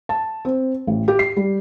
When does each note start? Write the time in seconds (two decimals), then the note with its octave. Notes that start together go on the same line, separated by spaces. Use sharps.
0.09 A5
0.45 C4
0.87 A1
1.08 G4
1.19 C7
1.36 G3